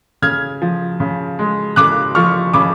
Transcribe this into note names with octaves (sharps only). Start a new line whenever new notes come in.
C#3 F6 G#6
F3
C#3
G#3
C#3 D6 F#6
F3 C#6 F6
C#3 B5 D6